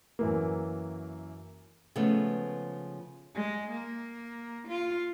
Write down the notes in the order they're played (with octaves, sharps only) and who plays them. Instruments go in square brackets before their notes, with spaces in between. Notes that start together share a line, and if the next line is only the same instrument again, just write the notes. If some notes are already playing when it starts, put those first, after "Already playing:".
[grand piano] F#2 E3 A#3
[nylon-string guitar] C#3 F3 G#3 A3 B3
[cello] G#3
A#3
F4